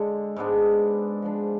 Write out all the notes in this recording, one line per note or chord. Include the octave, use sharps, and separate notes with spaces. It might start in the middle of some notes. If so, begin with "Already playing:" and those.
Already playing: D3 G#3 D4 A4
G#2 G#3 B3 D4
F3 G#3 D4